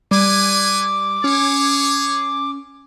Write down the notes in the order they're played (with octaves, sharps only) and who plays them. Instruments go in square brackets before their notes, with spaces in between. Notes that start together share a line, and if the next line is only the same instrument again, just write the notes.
[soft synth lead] G3 [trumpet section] A4 B4 G#5 [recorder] D6
[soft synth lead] C#4 [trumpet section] G#4 C#5